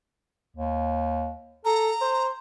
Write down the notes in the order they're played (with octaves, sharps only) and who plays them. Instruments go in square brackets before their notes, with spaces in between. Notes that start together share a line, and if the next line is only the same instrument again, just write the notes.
[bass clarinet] D#2
[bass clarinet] A4 [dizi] A#5
[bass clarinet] C5